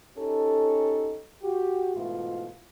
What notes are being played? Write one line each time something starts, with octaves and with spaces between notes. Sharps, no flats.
C#4 D#4 G4 A4
F#4 G4
G#2 B2 E3 A3 E4 F4